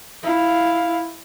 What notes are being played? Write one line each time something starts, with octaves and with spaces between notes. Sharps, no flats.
E4 F5